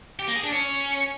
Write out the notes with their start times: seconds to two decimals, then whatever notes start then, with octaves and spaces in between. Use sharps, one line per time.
0.19 G4
0.27 A#3
0.36 G#4
0.44 D4
0.52 C#4